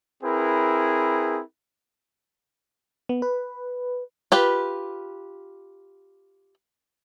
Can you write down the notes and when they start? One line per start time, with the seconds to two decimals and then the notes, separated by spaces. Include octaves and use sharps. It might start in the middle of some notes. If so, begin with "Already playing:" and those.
0.23 C4 E4 G#4 A#4 B4
3.09 B3
3.22 B4
4.32 F4 G4 B4